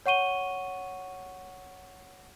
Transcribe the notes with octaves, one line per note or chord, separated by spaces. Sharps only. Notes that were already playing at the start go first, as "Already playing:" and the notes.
C#5 F#5 C#6 D#7 G7